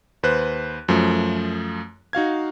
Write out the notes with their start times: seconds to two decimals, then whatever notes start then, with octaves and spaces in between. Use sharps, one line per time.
0.23 D#2 B4 C5 F#6
0.88 F#2 F3 A3
2.13 D#4 F#4 F5 G#6